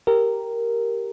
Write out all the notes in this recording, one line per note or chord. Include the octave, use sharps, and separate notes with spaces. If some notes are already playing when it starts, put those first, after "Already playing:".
G4 A#4